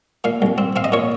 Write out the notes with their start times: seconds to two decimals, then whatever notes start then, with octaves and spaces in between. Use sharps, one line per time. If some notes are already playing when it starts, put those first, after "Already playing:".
0.24 A#2 F5
0.42 C2
0.58 C4
0.76 C4 F5
0.84 D#5
0.92 A#2 C#5